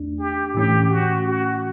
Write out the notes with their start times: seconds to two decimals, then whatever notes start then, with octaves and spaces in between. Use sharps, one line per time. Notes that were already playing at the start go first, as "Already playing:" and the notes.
Already playing: E2 A3 D4
0.19 G4
0.55 A2 E3 A3 C#4 G4
0.91 F#4
1.26 F#4